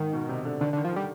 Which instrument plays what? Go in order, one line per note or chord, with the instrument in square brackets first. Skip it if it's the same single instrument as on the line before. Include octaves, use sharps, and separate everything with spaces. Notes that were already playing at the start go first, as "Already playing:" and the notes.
Already playing: [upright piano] G#2 [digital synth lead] D#3
[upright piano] B2
C3
D3
[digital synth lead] D3 [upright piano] D#3
[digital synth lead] D3
[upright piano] D#3
[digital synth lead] F3
[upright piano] D3
[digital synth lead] G3